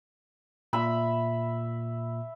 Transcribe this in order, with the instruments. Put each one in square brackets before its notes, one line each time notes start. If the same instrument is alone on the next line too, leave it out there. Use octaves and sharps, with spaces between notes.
[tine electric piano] A#2 [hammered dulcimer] E5 B5